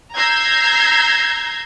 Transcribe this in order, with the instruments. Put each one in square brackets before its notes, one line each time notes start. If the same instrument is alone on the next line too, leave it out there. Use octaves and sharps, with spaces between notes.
[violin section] A#5 E6 G6 G#6 A#6 C7